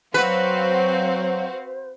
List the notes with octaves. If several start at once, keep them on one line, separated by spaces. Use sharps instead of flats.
F#3 C4 F#4 B4 C5 F5